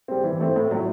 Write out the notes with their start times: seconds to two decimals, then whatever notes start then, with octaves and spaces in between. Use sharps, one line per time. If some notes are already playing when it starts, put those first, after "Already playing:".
0.08 G3 C4
0.24 E3
0.40 A3 C4
0.56 A2
0.71 F#3 A3